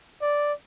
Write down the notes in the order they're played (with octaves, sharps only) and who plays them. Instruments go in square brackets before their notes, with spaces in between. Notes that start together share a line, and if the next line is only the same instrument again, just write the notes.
[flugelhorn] D5